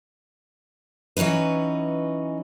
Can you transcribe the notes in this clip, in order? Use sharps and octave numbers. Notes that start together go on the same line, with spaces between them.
E3 F#3 C#4 D#4 B4